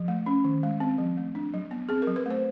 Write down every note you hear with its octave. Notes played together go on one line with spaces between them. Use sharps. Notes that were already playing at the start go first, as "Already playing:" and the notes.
Already playing: F3
A3
C#4
D#3
G#3
C4
F3
A3
D4
F#3
B3
C4 G#4
A#4
F#3
B4
A3 C5